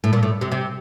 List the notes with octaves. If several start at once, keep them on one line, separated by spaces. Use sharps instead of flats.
A2
A#2
A2
C3
C3